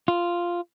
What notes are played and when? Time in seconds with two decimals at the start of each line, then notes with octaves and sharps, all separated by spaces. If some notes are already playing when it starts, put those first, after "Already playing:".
0.08 F4